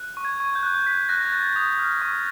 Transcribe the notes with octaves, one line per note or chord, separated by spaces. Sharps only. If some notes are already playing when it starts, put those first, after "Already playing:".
Already playing: F#6
C#6
G#6
C#6
G6
F#6
G6
F#6 B6
F#6 A#6
G#6
F#6 A6
D#6
F6
C#6